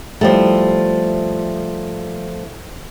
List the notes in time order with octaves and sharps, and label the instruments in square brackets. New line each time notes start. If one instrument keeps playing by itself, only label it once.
[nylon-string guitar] F3 G3 A3